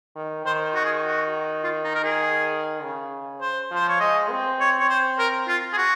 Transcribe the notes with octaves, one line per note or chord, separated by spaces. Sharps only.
D#3
D#3 C5
F#4
G#4
F#4
F4
D#4
A#4
G#4
C#3
C5
F3
C5
C#5
G#3 D#5
C4
C#5
C#5
C5
A#4
F4
G#4
F#4